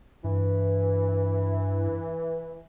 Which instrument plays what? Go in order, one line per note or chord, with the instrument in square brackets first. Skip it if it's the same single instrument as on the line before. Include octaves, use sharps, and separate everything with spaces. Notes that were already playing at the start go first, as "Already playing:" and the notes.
[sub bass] G2 [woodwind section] E3